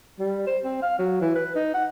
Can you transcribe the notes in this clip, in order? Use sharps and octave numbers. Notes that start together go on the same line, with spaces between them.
G3
C5
C4
F5
F#3
E3
B4
D#4
F#5